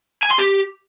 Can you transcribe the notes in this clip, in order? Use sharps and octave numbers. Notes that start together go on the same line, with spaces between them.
G#5
C6
G4